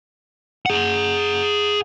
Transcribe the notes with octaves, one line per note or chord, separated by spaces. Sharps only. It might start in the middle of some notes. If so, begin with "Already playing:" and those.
G#4 F#5